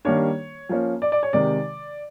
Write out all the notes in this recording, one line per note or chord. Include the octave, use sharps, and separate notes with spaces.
D#3 G3 A#3 D4 C#5
F3 A#3 C#4
D5
D5
C#5
C3 D#3 G#3 D5